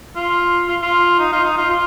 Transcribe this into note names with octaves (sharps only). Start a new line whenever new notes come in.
F4
F4
F4
D#4
F4
D#4
F4
F4